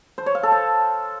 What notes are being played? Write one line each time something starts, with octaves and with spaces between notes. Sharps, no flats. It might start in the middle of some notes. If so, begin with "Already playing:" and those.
C5
C#5
F5
A4
C5